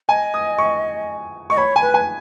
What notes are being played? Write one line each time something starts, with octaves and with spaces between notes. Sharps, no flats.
D#5 G#5
D#6
C#6
D#5 C#6
C#5 B5
G#5
B4
G#5